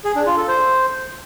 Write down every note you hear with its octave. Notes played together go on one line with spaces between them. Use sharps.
G#4
D4
F4
A4
C5